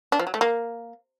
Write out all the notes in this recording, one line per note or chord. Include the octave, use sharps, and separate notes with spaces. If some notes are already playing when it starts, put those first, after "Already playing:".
D4
F3
F#3
A3
A#3